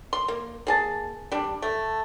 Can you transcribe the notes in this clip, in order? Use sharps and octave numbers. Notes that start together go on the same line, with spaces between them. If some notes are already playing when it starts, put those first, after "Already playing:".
C6
A#3
A#3 G#4 A5
G3 D4
A3